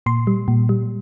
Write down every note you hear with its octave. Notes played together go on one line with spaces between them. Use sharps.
A#2 C6
G3
A#2
G3